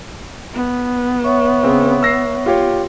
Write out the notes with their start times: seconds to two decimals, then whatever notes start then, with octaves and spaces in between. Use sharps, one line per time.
0.54 B3
1.24 C#5 E5 C#6
1.63 C#3 C4
2.02 E6 A#6 C7
2.46 F4 G4 C#5